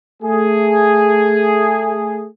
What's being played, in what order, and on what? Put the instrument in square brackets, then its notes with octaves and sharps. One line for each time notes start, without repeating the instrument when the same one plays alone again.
[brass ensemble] A3 G#4